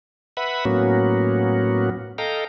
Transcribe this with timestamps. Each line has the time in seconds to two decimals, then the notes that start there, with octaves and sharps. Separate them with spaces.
0.37 B4 E5 F#5 B5
0.65 A2 F#3 A#3 B3 C#4 F#4
2.18 A4 D#5 F5 G5 A#5